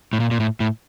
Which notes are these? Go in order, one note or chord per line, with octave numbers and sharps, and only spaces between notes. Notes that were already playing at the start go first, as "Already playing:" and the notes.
A2
A#2
A#2
A2
A2